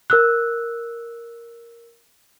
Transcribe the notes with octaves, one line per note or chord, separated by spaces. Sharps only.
A#4 E6 F#6